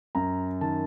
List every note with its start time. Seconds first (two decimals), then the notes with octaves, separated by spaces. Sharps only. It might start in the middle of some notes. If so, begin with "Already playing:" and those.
0.15 F#2 A#5
0.61 D#3 A5